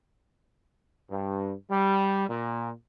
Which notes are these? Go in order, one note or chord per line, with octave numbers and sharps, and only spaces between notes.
G2
G3
A#2